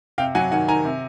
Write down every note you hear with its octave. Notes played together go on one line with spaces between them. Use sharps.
C3 F5 G5
F#3 F#5 G#5
D#3 F#5 G#5
D#3 G#5 A#5
C3